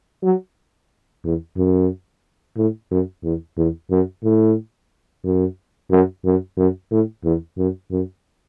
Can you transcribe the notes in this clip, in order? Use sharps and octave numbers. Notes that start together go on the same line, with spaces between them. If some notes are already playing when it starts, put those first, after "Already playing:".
F#3
E2
F#2
A2
F#2
E2
E2
F#2
A2
F#2
F#2
F#2
F#2
A2
E2
F#2
F#2